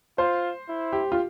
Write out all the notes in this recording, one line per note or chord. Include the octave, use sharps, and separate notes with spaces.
F4 C5
E4
G4
F4